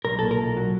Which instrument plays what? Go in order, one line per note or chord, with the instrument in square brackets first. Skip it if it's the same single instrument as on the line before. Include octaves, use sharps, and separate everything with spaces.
[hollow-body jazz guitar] B1 A#4
A#2 A4
A#4
B1
F#3